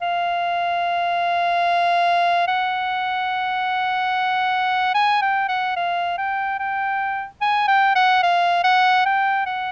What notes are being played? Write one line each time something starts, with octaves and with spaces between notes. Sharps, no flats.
F5
F#5
G#5
G5
F#5
F5
G5
G5
G#5
G5
F#5
F5
F#5
G5
F#5